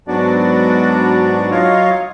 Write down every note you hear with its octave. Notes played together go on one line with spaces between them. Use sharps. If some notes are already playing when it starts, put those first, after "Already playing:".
G#2 F#3 B3 D4 F#4 D5
F#3 F4 C#5 D#5 F5